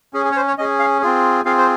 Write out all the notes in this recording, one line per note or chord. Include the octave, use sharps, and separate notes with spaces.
C#4 G#4
G#4
C#5
C5
C#5
C#4 G#4 D#5
F5
C4 F4 G#4
C4 F4 G#4 F5
C5